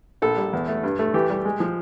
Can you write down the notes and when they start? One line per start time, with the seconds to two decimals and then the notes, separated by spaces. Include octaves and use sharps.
0.22 A#1 A4
0.37 G3
0.53 E2
0.68 A3
0.83 G2
0.99 A3
1.14 E3 G4
1.30 G3
1.45 G#3
1.60 F3